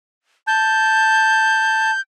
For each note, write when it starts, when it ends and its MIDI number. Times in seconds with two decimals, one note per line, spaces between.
0.47 1.90 81
0.47 2.00 91